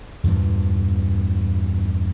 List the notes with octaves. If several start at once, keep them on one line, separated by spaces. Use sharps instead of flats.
E2 G2 A#2 E3